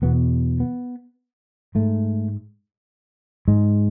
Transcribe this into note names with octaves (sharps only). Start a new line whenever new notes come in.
E2 B2 B3
B3
G#2 A3
G#2 G#3